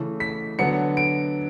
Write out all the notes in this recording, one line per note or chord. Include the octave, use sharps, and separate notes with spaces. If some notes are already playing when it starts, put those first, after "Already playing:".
Already playing: C#3 E3 A3
B6
D3 F#3 B3 D4 C#7
D7